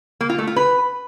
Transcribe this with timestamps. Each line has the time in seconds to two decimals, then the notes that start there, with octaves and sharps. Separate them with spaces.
0.21 A#3
0.30 F4
0.38 A3
0.47 F4
0.56 B4